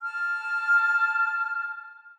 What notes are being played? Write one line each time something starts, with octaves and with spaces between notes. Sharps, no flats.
A5 F6